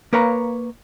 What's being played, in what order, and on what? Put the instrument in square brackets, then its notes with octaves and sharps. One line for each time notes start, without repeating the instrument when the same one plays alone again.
[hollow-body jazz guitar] A#3 A#4 B4 C#5 F5 A#5